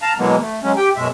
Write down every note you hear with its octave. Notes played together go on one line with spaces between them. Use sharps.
F5 A5 A#5
B2 E3 F#3 G#3 A#3 B3
A3
F#3 G#3 C#4
G4 G5
F#2 B2 G#3 E5